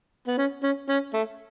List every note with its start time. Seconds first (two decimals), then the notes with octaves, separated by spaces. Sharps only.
0.28 B3
0.37 C#4
0.63 C#4
0.89 C#4
1.14 A3